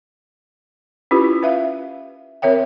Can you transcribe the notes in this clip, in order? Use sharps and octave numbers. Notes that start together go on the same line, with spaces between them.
C#4 E4 F4 G4 B4
B4 E5 F5
C4 A#4 C#5 E5 G5